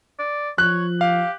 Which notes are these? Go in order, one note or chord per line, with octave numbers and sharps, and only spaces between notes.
D5
F3 C#5 F#6
G4 F5